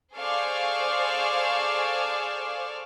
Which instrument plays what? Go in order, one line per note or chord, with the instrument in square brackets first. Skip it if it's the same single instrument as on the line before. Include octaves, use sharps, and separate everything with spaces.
[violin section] G#4 A4 C5 D5 F5 C#6